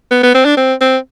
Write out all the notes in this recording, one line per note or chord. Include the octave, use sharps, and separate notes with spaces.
B3
B3
C4
D4
C4
C4